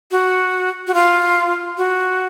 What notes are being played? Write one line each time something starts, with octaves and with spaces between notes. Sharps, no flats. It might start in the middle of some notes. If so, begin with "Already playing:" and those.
F#4
F#4
F4
F#4